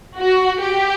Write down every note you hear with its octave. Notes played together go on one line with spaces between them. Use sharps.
F#4
G4